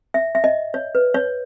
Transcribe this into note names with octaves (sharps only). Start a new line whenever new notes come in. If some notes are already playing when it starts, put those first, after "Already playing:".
E5
E5
D#5
C#5
B4
C#5